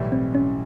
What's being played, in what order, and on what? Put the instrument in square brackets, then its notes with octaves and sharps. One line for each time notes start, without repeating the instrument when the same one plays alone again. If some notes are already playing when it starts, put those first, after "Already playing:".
Already playing: [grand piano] B1 A2 E3 G3
[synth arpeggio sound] C4
C#4